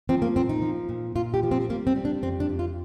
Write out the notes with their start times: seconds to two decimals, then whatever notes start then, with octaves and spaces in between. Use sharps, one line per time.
0.09 F3 C4
0.22 A#3
0.36 A#2 C4
0.49 D#4
0.62 F3
0.89 A#2
1.15 A#2 F4
1.34 G4
1.43 F3
1.51 C4
1.70 G3 A#3
1.87 C4
1.96 G3
2.05 D4
2.22 F2 C4
2.40 D4
2.49 F2
2.59 F4